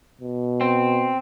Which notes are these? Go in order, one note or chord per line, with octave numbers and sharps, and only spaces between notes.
B2
C4